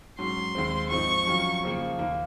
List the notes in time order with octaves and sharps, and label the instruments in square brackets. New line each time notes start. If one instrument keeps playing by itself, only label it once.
[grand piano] G#2 F#3 C#4 [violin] C6
[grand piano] D#2 D#3 G#3 C4
[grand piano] G#2 F3 C4 D#4 [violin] C#6
[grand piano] F2 D#3 F#3 C#4 F4
F2 C#3 F3 A#3
D#2 D#3 A#3